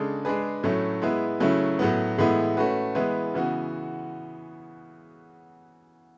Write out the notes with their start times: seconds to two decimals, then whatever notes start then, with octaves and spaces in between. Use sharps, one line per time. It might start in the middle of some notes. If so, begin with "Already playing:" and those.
Already playing: C#3 G#3 D4 A4
0.25 G#3 D4 G#4 B4
0.63 A2 F#3 A3 C#4 E4
1.02 G#3 B3 E4 B4
1.40 C#3 F#3 A3 C#4 E4
1.79 A2 F#3 B3
2.18 A2 E3 G#3 B3 E4
2.57 A3 C#4 F#4 B4
2.95 E3 G#3 B3 E4 B4
3.34 C#3 E3 B3 F#4